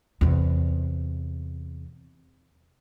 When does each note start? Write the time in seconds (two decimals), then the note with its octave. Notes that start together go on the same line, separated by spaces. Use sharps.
0.21 E2 C3